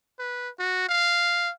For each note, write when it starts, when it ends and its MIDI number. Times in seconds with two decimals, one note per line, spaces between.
0.19 0.49 71
0.59 0.85 66
0.89 1.51 77